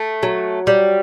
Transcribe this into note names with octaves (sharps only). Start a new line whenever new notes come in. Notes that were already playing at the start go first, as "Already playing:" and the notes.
Already playing: A3
F#3
G3